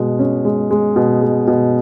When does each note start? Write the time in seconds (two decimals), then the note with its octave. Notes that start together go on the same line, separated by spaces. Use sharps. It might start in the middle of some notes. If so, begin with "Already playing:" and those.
Already playing: B2 G#3
0.19 C#4
0.45 G#3
0.71 G#3
0.96 B2
1.22 G#3
1.47 B2